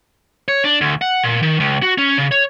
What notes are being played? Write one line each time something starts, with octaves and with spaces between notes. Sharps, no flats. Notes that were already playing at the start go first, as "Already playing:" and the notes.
C#5
D4
D2
F#5
A#2
D#3
C#2
F#4
C#4
C#3
C#5